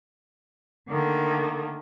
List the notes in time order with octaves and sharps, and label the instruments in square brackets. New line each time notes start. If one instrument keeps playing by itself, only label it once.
[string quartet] D3 D#3 A3 A#3